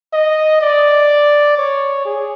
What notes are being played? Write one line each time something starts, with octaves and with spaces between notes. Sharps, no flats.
D#5
D5
C#5
G#4